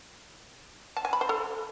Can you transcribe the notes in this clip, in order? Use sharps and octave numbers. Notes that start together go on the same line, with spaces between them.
A5
G#5
B5
C5
A4